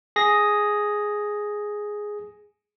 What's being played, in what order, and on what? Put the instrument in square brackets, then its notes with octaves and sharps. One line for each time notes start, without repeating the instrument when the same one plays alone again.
[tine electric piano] G#4 A#6